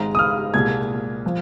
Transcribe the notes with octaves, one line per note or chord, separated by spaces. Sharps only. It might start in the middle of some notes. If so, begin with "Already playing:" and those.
Already playing: G#1 G#2 G#3 A#5
D#6
F6
C2 A#2 G#3 G#6
F3